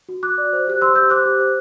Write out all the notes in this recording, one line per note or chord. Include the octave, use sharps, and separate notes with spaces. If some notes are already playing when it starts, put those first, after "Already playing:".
F#4
F#4 D6 F#6
D5
C5
G4 F#6
C5 C6 E6
G4 E6 G6
C5 D6 F#6
G4
C5